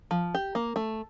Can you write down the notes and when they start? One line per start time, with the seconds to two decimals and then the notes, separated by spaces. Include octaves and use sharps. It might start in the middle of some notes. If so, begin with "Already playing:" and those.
0.11 F3
0.35 G4
0.55 A#3
0.76 A3